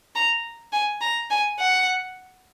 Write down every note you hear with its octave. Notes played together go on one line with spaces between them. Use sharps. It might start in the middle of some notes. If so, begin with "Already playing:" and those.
A#5
G#5
A#5
G#5
F#5